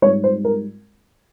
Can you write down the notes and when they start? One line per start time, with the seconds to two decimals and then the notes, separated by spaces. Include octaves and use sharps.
0.02 G#2 G3 C#5
0.24 C5
0.44 A#4